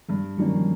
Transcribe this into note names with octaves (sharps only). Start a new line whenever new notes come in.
G2 G#3
G3
D#3 F#3 G3 A#3 C#4
F3